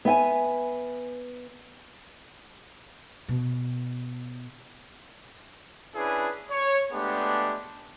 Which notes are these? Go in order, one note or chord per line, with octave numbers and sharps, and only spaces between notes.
B3 E5 G5 G#5
B2
C#4 D4 E4 G#4 B4
C#5
G#3 A3 B3 D4 G4